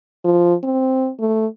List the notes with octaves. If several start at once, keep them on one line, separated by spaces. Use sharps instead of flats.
F3
C4
A3